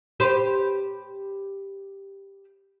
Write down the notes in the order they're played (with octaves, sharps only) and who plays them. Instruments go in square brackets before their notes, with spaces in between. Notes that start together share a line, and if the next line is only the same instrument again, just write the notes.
[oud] G4 B4 C5